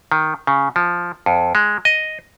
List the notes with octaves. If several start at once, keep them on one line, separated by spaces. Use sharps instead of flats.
D#3
C#3
F3
F2
G#3
D#5